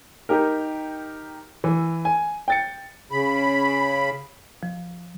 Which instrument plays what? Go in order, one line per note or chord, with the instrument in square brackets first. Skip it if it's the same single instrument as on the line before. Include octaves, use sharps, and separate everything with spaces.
[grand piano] D#4 G4 A#4
E3
G#5
G5 A6 C#7
[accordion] C#3 B5
[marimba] F3